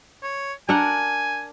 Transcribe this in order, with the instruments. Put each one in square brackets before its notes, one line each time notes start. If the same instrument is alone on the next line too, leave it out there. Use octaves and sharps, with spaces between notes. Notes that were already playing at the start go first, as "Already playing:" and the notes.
[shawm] C#5
[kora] D4 A#4 F#5 [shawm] G#5